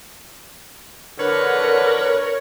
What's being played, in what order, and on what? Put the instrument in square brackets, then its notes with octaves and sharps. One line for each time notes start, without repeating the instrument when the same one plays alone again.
[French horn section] D3 [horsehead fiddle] A#4 [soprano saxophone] B4 [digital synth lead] C#5